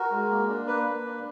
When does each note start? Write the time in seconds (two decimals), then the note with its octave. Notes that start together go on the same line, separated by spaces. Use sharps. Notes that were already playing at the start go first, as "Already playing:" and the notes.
Already playing: F#4 A#4
0.11 G#3
0.30 A#3
0.49 D4
0.67 A#3 B4
0.85 A#3
1.04 D4